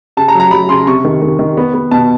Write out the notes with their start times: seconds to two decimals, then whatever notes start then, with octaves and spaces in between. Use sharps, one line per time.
0.17 C#3 A5
0.28 A#5
0.35 F#3
0.40 A#5
0.51 F#3 B5
0.69 C#3 C6
0.87 C3 C#6
1.05 D#3
1.22 D#3
1.39 D#3
1.57 B3
1.74 B3
1.91 B2 A5